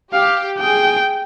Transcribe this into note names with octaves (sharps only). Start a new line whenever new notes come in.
G4 F5
G#4 G5